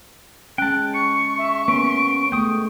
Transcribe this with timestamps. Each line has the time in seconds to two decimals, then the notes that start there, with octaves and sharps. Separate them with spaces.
0.58 G#3 C#4 G5 A5 F#6
0.94 C#6 C#7
1.38 E5
1.68 A#3 B3 C#4 D7
2.32 G#3 A3 B3 G5 D#6